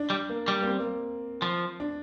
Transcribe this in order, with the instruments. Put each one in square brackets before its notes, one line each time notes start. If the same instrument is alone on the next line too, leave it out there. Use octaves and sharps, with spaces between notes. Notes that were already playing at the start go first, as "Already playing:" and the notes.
Already playing: [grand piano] D4
[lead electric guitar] G3
[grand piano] A#3
[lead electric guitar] G3
[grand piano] A#3
C4
A#3
[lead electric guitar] F3
[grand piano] D4